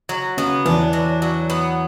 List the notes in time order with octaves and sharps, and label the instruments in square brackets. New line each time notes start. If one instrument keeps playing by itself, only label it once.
[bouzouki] F#3
[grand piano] C#3 [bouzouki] B3
[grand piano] E2 E3 [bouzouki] D4
[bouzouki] F#3
F#3
B3